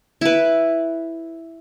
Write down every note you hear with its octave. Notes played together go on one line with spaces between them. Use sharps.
E4 B4